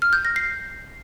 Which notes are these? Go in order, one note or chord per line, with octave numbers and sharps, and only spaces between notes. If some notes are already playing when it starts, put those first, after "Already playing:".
F6
G6
A#6
C7